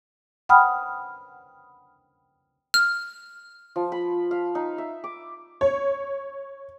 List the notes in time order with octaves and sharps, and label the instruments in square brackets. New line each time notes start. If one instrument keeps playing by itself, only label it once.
[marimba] F#5 G5 B5 D#6 F6
[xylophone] F6
[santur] F3
B5
F5
D#4
E5
D6
[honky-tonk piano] C#5